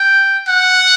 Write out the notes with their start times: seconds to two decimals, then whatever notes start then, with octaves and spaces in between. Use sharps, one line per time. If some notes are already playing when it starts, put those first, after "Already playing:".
Already playing: G5
0.48 F#5